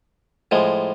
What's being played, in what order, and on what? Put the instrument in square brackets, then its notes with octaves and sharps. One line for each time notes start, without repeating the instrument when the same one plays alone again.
[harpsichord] A2 F3 G#3